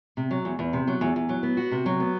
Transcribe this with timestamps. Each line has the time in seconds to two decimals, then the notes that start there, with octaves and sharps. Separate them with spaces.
0.17 C3
0.31 F#3
0.45 E2
0.59 E2
0.73 C3
0.88 F#3
1.01 E2
1.16 E2
1.29 F#3
1.43 B3
1.57 F#4
1.72 C3
1.86 F#3
2.00 B3